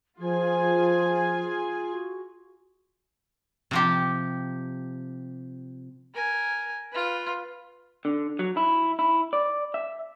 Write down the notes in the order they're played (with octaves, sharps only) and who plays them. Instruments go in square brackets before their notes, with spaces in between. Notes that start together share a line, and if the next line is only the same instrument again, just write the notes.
[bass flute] F3 [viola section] F4 G#4 G#5
[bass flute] F#4
[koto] C3 F3 G4
[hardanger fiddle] A#4 G#5
F4 B4
[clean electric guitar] D3
F#3
E4
E4
D5
E5